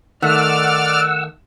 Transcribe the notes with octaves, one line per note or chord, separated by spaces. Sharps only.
D#3 A3 D5 F#5 E6 F6